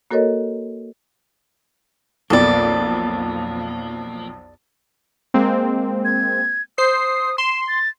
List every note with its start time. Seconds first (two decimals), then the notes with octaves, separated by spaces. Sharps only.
0.11 A#3 F#4 A4 A#4 C#5 D#5
2.30 B1 F2 A#3 A4 D5
5.34 G#3 A#3 C4
6.05 G#6
6.78 C5 D#6 C7
7.38 C6 E7
7.68 A6